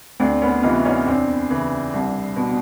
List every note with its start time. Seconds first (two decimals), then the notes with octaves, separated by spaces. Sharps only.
0.20 D2 C4 D4
0.42 B3 C#4
0.63 C3 E3 D#4 F4
0.85 C#4 D#4
1.06 E2 C4 D4
1.50 C#3 E3
1.94 C2
2.36 B2